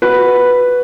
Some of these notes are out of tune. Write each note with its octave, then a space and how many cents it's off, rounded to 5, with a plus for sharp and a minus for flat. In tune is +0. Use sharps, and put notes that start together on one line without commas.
F#4 +0 B4 +0